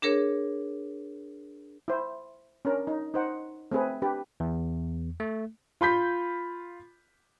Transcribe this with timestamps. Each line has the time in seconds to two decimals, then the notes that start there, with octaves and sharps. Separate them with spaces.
0.02 D4 G#4 A#4 C#5
1.88 E4 C5
2.65 C#4 D4 A#4
2.87 D#4
3.14 D#4 C5 F#5
3.71 A3 C4 G#4 B4
4.02 D4 G4 B4
4.40 E2
5.20 A3
5.81 F4 B5 G6 B6